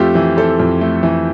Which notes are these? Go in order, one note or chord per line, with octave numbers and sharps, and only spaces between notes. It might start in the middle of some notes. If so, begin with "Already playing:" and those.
Already playing: F2 A3 C4 F4 G4
E3
C4 A4
F2
A3
E3